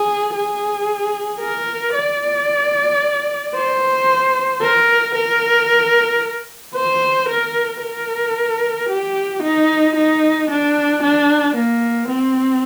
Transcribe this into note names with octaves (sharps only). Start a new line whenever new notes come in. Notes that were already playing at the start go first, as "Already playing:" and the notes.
Already playing: G#4
G#4
A#4
D5
C5
A#4
A#4
C5
A#4
A#4
G4
D#4
D#4
D4
D4
A#3
C4